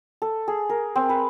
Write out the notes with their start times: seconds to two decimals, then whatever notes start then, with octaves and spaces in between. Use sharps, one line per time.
0.22 A4
0.48 G#4
0.69 A#4
0.96 C4
1.09 B4